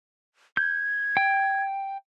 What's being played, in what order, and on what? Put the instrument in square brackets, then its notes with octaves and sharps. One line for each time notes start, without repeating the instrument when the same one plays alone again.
[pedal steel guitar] G6 [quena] G#6
[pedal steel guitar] G5